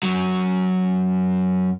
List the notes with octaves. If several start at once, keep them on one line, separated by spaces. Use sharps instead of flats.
F#2 F#3